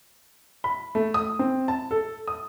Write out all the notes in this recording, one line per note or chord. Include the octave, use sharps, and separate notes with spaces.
B5
A3
D#6
C4
A5
A4
D#6